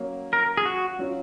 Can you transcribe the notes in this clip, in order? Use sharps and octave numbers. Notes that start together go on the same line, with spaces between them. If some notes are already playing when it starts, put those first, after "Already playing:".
Already playing: F#3 A#3 C#4
A#4
G#4
F#4
F#3 C#4 F4